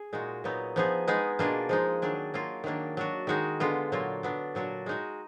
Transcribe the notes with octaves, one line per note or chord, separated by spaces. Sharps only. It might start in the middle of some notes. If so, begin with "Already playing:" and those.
Already playing: G#4
A#2 G#3 D#4 F#4
A#2 F#3 B3 D#4
F3 B3 D#4 G#4
G#3 B3 D#4 G#4
B2 A#3 D4 F4 G#4
F3 G#3 D#4
D#3 F#3 D4 G#4
F#3 A#3 F4 G#4
D#3 F#3 A#3 D4
F#3 D4 F#4
D#3 G#3 D#4 F#4
D3 G#3 B3 F4
A#2 F#3 A#3 F4
F#3 B3 D4
A#2 F#3 D4 F#4
G#3 D#4 F#4